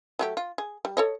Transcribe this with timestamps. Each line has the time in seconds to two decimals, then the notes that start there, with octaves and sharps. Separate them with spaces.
0.19 F#3 A3 G4
0.37 F4
0.58 G#4
0.85 G3
0.97 A4 C#5 D#5